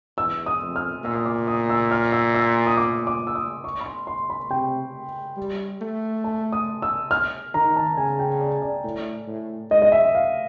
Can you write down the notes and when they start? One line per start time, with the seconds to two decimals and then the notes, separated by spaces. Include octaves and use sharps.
0.18 E2 E6
0.46 D#6
0.61 F2
0.76 F6
1.04 A#2 E6
1.16 D#6
1.25 D6
1.47 D#6
1.70 E6
1.91 F6
2.12 E6
2.34 E6
2.67 D#6
2.77 D6
3.07 D6
3.27 E6
3.35 D#6
3.64 C#6
3.80 B5
3.86 C6
4.07 C6
4.30 B5
4.50 C3 G5
5.37 G3
5.81 A3
6.24 A5
6.52 D#6
6.82 E6
7.11 F6
7.54 D#3 A#5
7.76 A5
7.97 C#3 G#5
8.19 G5
8.41 D5
8.62 D5
8.84 A2
9.28 A2
9.71 G#2 D#5
9.82 D#5
9.92 E5
10.00 F#2
10.15 F5